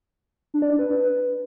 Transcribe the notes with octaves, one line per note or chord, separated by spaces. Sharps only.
D4
D5
D4
B4